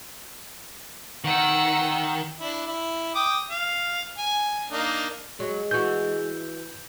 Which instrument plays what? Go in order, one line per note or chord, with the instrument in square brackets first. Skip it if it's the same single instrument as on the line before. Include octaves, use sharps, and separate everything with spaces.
[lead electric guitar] D#3 [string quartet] F#5 E6
[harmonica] D4 E4
E4
G5 D6 D#6
F5
G#5
A#3 D4 D#4
[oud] F#3 [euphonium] G#3
[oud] E3 F#4 [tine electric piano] G6